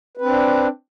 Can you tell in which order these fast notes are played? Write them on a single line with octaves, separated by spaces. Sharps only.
B4 C4 D4